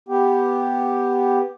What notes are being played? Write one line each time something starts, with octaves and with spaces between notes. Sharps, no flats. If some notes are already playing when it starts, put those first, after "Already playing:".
B3 G4